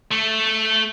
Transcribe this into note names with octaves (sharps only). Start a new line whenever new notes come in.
A3